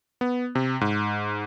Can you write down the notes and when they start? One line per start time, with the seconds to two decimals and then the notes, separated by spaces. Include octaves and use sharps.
0.21 B3
0.55 C3
0.81 G#2